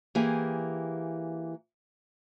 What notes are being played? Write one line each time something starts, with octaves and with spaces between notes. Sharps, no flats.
E3 A#3 G4 G#4